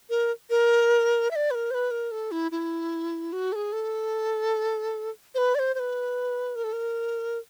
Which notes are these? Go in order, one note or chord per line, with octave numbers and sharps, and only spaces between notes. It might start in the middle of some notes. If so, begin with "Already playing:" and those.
A#4
A#4
E5
D5
B4
A#4
C5
B4
A#4
A4
E4
E4
F#4
A4
G#4
A4
C5
B4
D5
C5
C5
B4
A#4
A4
A#4